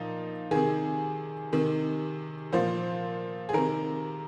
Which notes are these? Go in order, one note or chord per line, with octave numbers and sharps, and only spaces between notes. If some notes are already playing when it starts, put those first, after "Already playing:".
Already playing: A#2 F3 D#4
C3 D#3 G#4
C3 D#3
A#2 F3 C5
G#4
C3 D#3 A#4